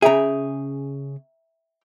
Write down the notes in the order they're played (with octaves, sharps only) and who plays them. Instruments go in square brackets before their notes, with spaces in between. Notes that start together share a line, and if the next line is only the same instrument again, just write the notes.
[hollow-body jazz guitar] C#3 G#4 [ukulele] E5 G5 A#5